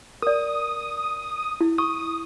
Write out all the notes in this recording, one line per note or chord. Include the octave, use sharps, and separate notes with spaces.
A#4 D5 D#6
E4
C#6 D#6